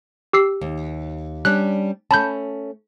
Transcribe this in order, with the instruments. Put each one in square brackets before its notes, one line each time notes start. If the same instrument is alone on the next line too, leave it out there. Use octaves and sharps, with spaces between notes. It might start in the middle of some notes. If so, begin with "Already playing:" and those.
[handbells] G4 E6 C7
[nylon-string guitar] D#2
[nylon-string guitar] G3 C#4 D4 [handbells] F#6
[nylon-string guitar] A3 C#4 [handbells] A5 B5 G6